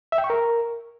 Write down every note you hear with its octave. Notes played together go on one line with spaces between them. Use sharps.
E5
G5
C#6
A#4